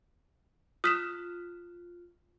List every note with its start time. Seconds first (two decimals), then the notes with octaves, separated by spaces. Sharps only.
0.84 F4 D#6 F6 F#6 B6 E7